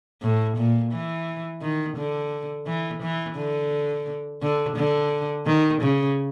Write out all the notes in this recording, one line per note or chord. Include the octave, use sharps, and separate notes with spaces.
A2
A#2
E3
D#3
D3
E3
E3
D3
D3
D3
D#3
C#3